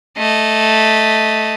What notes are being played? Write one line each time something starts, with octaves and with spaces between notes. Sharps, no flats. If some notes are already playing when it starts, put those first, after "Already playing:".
A3 D#5